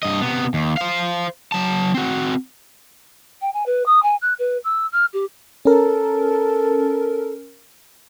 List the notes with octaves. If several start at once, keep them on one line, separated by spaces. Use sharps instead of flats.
G2 D#5
C3 B3
D#2
C5 F5
F#3 A5
C4 F#4
G5
G#5
B4
D#6
G#5
F#6
B4
E6
F6
G4
C#4 A4 A#4